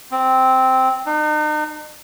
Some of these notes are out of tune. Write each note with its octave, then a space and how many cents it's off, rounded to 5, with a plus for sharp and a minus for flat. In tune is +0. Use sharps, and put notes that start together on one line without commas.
C4 -5
D#4 -40